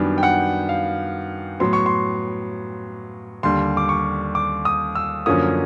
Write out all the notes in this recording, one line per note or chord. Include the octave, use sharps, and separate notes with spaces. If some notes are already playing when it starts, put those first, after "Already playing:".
Already playing: F#2 D#3 G3 B3 D4
G5
F#5
F5
A2 F#3 B3 C6
C#6
C6
D#2 D3 G3 C6
D6
C#6
D6
D#6
E6
F#2 D3 F3 A#3 C#4 D#6